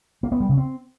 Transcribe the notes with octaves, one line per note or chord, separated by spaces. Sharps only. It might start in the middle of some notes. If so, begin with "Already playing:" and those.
A#3
B3
G3
C#3
C4